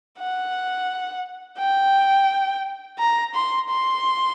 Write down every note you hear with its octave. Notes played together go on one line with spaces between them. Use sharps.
F#5
G5
A#5
C6
C6